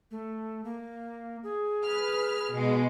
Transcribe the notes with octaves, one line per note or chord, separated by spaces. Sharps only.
A3
A#3
G#4
B4 F6
B2 G#3